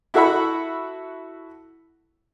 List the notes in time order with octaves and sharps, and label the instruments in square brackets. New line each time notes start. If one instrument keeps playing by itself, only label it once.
[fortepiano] E4 F#4 A4 E5 F#5 B5